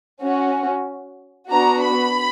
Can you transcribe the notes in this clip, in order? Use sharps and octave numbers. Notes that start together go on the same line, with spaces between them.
C#4 F#4
B3 D4 F#4 A#5
B5